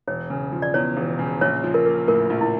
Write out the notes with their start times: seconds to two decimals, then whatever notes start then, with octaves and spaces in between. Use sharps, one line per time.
0.08 E1 C#5
0.30 C#3
0.52 F3
0.62 D5
0.74 E2 C#5
0.97 E1
1.19 C#3
1.41 A#1 C#5
1.64 F3
1.74 A#4
1.86 A#3
2.07 A2 A#4
2.30 A#1
2.41 E4